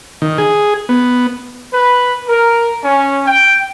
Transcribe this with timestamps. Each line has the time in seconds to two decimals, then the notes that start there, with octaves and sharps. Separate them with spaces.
0.22 D#3
0.38 G#4
0.89 B3
1.73 B4
2.28 A#4
2.84 C#4
3.27 G5